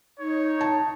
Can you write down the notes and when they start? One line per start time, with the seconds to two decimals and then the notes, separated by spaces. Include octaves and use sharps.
0.19 D#4 C#5
0.61 A5